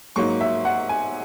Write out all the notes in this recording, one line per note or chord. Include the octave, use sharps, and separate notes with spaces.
G#2 F#3 A#3 C#6
E5
F#5
G#5